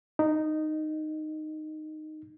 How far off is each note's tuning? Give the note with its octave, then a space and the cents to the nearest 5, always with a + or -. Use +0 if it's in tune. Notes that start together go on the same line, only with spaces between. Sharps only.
D#4 -10